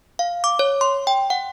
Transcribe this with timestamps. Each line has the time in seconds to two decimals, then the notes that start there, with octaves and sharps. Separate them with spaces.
0.19 F5
0.44 D6
0.59 C#5
0.81 C6
1.07 G5
1.30 F#5